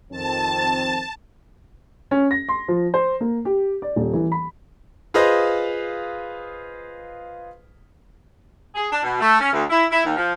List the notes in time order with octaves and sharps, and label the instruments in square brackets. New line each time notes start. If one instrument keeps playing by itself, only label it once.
[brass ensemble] F2 D#3 C4 [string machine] A5
[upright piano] C#4
A#6
C6
F3
C5
A#3
G4
D5
D#1
E3
B5
[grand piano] F4 G#4 B4 C5 D#5 F5
[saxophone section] G#4
D4
B2
A3
C#4
D2
E4
E4
D#2
F3